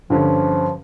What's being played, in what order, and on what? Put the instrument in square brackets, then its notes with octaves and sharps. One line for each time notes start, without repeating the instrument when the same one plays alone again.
[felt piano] G2 D3 C#4 [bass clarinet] F3